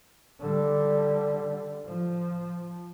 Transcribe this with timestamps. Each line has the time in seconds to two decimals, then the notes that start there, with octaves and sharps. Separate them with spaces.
0.41 D3 G3
1.86 F3